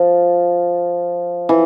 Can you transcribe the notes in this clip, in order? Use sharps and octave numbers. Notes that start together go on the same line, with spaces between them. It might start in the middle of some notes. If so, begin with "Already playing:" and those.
Already playing: F3
E3